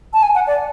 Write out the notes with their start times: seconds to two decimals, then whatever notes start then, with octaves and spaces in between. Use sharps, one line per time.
0.13 A5
0.23 G#5
0.35 F#5
0.47 D5